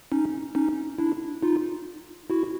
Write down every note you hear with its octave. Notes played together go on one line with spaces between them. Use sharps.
C#4 D#4
C#4 D#4
D4 E4
D#4 F4
E4 F#4